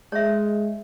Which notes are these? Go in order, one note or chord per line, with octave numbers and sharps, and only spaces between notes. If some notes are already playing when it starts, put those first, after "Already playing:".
G#3 C#5 E5